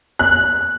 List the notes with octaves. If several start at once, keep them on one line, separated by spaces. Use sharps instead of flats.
F#6